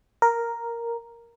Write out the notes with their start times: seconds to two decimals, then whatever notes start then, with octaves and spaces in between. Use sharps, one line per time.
0.22 A#4